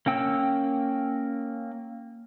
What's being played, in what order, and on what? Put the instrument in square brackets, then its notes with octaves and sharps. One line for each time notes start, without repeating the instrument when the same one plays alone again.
[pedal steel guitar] A#3 C#4 G5 E6